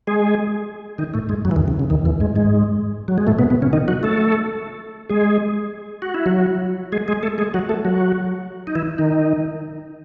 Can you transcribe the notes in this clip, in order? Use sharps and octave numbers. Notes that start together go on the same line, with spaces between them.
G#3 G#4
D#3 D#4
A2 A3
G#2 G#3
F#2 F#3
E3
D#2 D#3
C#3
C#3
D#2 D#3
E2 E3
G#2 G#3
G#2 G#3
F#3
G#3
A2 A3
B2 B3
B2 B3
C#3 C#4
D#3 D#4
F#3 F#4
A3 A4
G#3 G#4
F#4
E4
F#3 F#4
G#3 G#4
G#3 G#4
A3 A4
G#3 G#4
F#3 F#4
A3 A4
F#3 F#4
D#4
E3 E4
D#3 D#4